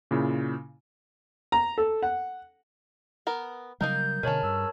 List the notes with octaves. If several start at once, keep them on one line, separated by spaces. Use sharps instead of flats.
A#2 C#3 E4
A#5
A4
F#5
B3 A#4
C#3 F#3 G3 A#3 D#4 A#4 G6
B2 D3 G#3 C#4 A#4 C#5 A5
G2 E6